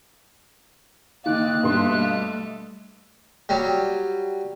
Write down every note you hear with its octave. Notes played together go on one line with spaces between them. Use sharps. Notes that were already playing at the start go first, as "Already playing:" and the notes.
D3 D#3 A#3 D5 D#5 F#6
G2 B2 G3 A3 C6
F#3 G3